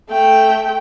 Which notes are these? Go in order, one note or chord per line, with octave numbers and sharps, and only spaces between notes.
A3 G5